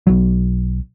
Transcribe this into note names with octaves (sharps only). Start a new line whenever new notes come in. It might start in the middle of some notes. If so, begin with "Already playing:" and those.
B1 F#3